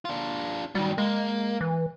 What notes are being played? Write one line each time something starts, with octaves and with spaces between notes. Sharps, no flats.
D4 F4
D#3 F#3 G3
G#3 A#3
E3